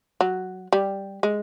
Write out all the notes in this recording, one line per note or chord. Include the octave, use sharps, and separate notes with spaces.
F#3
G3
G#3